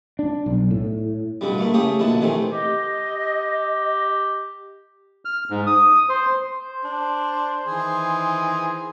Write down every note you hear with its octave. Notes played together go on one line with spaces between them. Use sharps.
D4
B1
A2
G2 B2 D3 G3
A3 A#3 E4
C#3 A3 G4 E5 D#6
A#1 B2 D3 E4 A5
C3 D#3 E3 A3 C4
G4 D#5
F6
G#2
D#6
C5
C5
D4
D#3 E3 G#4